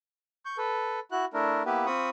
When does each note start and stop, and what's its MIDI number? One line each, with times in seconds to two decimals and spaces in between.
0.45 0.57 85
0.45 0.57 91
0.58 1.00 69
0.58 1.00 71
1.12 1.25 64
1.12 1.25 66
1.12 1.25 90
1.34 1.63 57
1.34 1.63 62
1.34 1.63 64
1.34 1.63 70
1.66 1.86 58
1.66 1.86 59
1.66 1.86 64
1.66 1.86 67
1.66 1.86 71
1.86 2.10 60
1.86 2.10 65
1.86 2.10 83
1.86 2.10 85
1.86 2.10 87